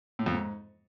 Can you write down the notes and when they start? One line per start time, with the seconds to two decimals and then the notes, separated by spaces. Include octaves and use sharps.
0.19 A2
0.26 F2
0.34 G#2